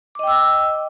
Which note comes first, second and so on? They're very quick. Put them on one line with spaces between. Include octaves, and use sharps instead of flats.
D6 D#5 G5 E6